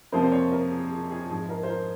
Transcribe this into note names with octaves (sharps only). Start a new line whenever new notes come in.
F2 C3 F3 A#3 C5
C5
C#5
A#4
G#4
G#4
G#4
G#2 F3 G#3 G#4
A#4
C5
A#4